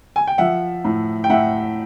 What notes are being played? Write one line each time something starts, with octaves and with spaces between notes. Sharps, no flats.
G#5
G5
F3 E5 F#5
A2
G5
A2 E5 F#5